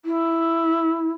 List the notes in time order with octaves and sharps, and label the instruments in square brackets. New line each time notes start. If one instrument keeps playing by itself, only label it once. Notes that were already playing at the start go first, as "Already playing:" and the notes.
[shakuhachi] E4